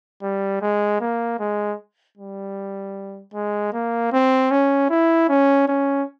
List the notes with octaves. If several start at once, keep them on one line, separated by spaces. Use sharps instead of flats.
G3
G#3
A#3
G#3
G3
G#3
A#3
C4
C#4
E4
C#4
C#4